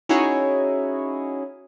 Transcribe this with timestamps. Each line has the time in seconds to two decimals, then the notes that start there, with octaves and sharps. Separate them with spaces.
0.09 C#4 D#4 E4 F#4 G#4 C#5